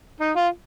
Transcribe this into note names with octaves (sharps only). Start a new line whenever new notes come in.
D#4
F4